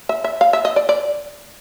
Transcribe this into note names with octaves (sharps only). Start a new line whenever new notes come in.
E5
E5
F5
E5
D#5
D5
D5